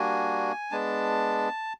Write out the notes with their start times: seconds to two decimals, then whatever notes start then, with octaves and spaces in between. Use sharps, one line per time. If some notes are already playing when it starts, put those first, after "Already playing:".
Already playing: G3 A#3 D4 F#4 G#5
0.71 G#3 B3 D4 A5